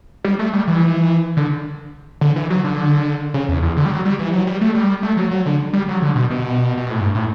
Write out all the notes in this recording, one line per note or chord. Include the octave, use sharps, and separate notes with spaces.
G3
A3
G3
E3
D3
D3
E3
F#3
D3
C#3
E2
E2
D3
G3
F#3
G3
E3
F#3
G3
A3
G3
A3
F#3
F#3
D3
G3
F#3
D3
B2
B2
B2
A2
G2
A2